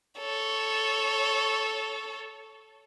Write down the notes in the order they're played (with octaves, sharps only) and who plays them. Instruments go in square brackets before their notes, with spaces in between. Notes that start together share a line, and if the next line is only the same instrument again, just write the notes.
[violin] A4 C#5